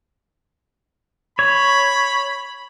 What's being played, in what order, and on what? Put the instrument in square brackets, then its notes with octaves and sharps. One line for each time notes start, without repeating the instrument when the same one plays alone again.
[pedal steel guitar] C#5 [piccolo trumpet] B5